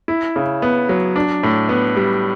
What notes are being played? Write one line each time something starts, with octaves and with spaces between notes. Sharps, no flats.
E4
C#3
B3
F#3
D4
A2
B3
G3